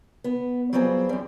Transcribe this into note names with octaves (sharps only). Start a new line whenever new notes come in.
B3
F#3 G3 B3 C4 F4 G#4
F#2 G3